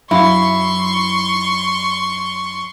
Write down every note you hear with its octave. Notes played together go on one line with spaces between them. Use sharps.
F#2 E4 F5 C6 C#6